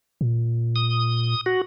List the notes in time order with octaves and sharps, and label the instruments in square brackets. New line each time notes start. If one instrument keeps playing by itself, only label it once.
[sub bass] A#2
[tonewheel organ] D#6
F#4